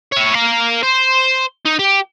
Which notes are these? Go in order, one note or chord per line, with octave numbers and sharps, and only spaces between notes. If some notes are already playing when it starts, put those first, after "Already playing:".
E4 C#5
A#4 F5
C5
D#4
G4